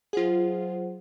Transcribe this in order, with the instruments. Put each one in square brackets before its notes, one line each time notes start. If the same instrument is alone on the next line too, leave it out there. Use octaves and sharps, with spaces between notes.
[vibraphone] F#3 C5 F#5 [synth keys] F4 G#4